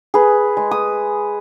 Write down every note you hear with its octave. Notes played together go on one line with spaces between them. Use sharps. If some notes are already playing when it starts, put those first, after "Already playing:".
G#4 B4
G#3
D#6